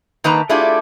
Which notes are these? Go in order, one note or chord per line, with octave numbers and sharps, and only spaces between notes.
D#3 A#3 D#4 B4 A5 A#5
A3 D4 E4 F4 G4 G#4